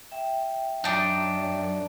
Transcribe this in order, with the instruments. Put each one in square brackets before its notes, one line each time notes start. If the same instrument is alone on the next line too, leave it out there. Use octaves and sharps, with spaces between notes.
[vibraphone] E5 G5
[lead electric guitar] F#2 [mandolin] D4 D#4